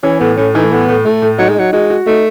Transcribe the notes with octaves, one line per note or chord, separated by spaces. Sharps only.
E3 C#4
A2 B3
A2 C#4
E3 D#4
A3
A2 B3
A2
A2 A3
A2
F#3 D#4
G#3
F#3 D#4
G#3 F#4
F#4
A3 D#4